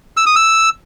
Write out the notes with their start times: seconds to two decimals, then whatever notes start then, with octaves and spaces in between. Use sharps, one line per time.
0.17 E6
0.26 D#6
0.36 E6